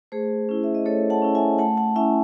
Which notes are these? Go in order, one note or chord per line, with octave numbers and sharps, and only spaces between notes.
A3 G#4 C5
C#4 E4
E5
D#5
A3 A4 C#5
F#5 A5
C#4 E4
E5 G#5
A3 F#5 A5
F#5 A5
C#4 E4 E5 G#5